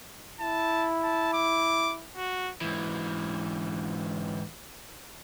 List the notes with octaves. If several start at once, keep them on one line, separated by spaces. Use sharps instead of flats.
E4 A5
A5
D6
F#4
G#2 E3